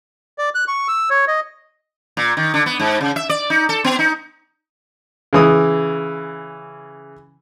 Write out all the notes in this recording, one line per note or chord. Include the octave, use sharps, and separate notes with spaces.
D5
F#6
C#6
E6
C#5
D#5
A#2
D#3
D3
B3
G#2
C#3
E5
D5
D#4
A4
B3
D#4
C#3 E3 D#6